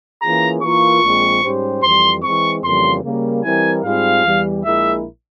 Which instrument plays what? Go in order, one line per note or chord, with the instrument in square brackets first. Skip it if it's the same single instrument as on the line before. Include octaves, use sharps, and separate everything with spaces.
[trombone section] E3 A#3 C#4 F4 G#4 [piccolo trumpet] A#5
[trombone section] E3 A#3 F4 A#4 [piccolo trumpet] C#6
[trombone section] A#1 A#2 F3 G#3 C4
G#2 G3 C#4 G4 C5
[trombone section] F2 E3 G3 [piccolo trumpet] C6
[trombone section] E3 G#3 C4 [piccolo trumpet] C#6
[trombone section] F2 C#3 E3 G3 A#3 [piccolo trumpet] C6
[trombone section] C#3 G3 A#3
[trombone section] E3 G3 C4 E4 A#4 [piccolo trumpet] G#5
[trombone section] G#2 G3 C4 F4 G#4 [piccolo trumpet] F5
[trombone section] E2 E3 G3
[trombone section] A#1 A#2 G#3 E4 A#4 [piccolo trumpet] E5